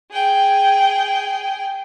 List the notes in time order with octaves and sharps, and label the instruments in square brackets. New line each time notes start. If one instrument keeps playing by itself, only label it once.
[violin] G#4 G5